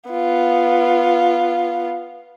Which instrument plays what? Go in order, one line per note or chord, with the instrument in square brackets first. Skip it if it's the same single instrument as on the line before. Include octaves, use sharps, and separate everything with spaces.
[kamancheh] B3 F4